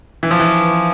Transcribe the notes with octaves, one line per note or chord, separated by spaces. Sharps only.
E3
F3
E3